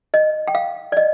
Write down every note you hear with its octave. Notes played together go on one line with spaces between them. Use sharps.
D#5
G5
F5
D5
D#5